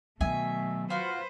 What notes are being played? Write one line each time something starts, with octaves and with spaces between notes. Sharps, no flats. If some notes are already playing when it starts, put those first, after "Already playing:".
B2 D#3 F#3 A3 E5 G#5
F4 F#4 B4 C5